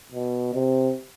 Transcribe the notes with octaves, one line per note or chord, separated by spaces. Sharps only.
B2
C3